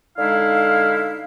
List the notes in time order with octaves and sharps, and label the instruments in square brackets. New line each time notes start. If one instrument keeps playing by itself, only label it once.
[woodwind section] D3 G#3 D#4 E4 F5